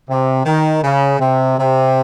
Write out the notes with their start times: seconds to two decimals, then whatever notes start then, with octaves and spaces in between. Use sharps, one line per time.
0.09 C3
0.45 D#3
0.83 C#3
1.20 C3
1.58 C3